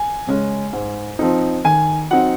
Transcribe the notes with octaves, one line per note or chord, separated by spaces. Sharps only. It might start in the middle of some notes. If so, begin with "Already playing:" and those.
Already playing: G#5
C#3 G#3 C#4
G#2
F3 C4 D#4
D#3 G#5
F#3 C4 D#4 F#5